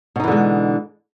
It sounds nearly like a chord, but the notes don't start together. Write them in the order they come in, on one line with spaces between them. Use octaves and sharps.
B2 D#4 E3 D3 G#3